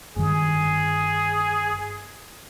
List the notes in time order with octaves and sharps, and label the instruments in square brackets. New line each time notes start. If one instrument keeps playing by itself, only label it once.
[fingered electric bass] G1 G2 D#3 [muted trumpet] G#4